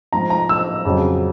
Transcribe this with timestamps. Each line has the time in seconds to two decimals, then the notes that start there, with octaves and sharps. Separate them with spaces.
0.13 G#2 F3 A#5
0.30 A#5
0.49 E6
0.85 F2 C#3 F#3